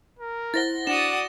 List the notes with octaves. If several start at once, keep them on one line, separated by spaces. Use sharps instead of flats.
A#4
E4 C5 F#5 A6 A#6 G7
D4 F#4 D5 D#6 E7